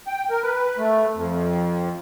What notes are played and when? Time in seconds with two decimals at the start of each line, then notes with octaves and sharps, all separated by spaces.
0.07 G5
0.30 A#4
0.42 B4
0.78 A3
1.15 F2